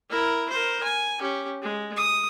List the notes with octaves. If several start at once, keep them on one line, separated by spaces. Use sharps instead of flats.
E4 A#4
A#4 C5
G#5
C#4 G4
G#3
D#6